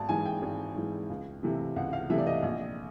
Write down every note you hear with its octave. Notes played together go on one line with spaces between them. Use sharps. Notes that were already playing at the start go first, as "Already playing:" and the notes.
Already playing: G#1 A5
G#2 E3 G#5
G5
G#1
G#2 E3
C#2
C3 E3 A3
C#2 F#5
F5
C3 E3 A3 E5
D5
D#5
A#1